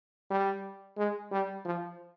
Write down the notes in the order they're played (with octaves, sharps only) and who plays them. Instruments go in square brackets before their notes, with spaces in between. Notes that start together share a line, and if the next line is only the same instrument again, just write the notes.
[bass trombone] G3
G#3
G3
F3